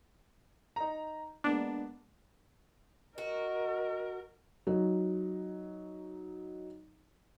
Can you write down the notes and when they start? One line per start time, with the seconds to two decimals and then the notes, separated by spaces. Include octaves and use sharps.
0.76 D#4 A#5
1.44 G#3 A#3 B3 D4
3.18 F#4 A#4 D#5
4.67 F#3 D#4